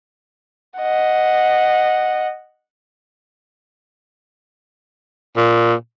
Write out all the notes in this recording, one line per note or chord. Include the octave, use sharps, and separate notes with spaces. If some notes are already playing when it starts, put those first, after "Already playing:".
D#5 F#5
A#2